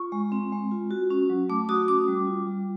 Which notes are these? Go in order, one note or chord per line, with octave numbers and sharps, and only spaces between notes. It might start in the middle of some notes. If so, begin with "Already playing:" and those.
Already playing: F4 C#6
G#3
C4
G#3
F4
F#4
C#4
F#3
A3 D6
F#4 D#6
C#4 D6
G3
F4
G3